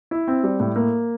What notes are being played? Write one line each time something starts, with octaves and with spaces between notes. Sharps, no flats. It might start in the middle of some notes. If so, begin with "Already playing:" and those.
E4
C4
G3
A2
A#3